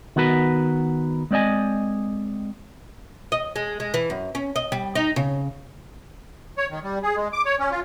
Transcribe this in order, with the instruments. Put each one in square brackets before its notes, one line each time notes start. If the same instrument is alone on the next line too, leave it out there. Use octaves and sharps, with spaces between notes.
[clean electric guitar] D#3 B3 F#4 A#4 B4
G#3 C4 D5 D#5 G#5
[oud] D#5
G#3
G#3
E3
F#2
C#4
D#5
G3
D#4
C#3
[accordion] C#5
D#3
G3
G#4
G#3
D6
C#5
C#4
F4